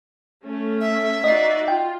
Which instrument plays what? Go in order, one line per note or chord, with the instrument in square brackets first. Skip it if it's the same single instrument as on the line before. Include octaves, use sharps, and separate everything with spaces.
[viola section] A3 C#4
[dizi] E5
[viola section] D#4 F#4 D5 [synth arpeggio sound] D#5 C7
[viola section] F4 [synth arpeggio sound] G5